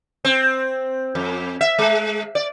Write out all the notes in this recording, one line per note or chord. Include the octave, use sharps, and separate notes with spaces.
C4
F2
E5
G#3
D5